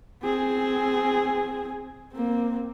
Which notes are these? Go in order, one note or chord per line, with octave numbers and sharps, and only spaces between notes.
C4 G#4
A#3 C4